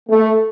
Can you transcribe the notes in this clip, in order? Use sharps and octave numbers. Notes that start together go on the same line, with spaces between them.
A3